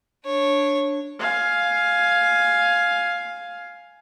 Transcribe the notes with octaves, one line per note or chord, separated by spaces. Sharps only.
D4 C#5
F5 G#5